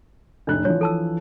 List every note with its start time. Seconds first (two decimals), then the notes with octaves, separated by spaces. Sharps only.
0.47 F1 A2 D4 F#6
0.65 E3 F3 C#5
0.81 A4 A5 E6